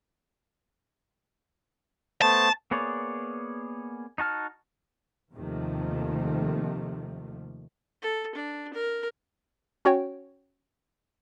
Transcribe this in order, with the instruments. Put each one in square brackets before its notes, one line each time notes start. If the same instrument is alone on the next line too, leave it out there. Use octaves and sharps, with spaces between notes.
[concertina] A3 B3 C5 [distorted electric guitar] A5
[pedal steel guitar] A#3 B3 G#4 C#5 D5
D#4 F#4 A5 F6
[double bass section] D#2 C3 D#3 F3 A3
[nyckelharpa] A4
D4
A#4
[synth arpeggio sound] C#4 F#4 C#5 G5